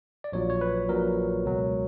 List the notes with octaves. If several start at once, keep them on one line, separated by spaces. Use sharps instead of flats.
D5
A#1 A#2 F#3 C#5
C#5
B4
A#1 A#2 F#3 A#4
C#2 B2 F#3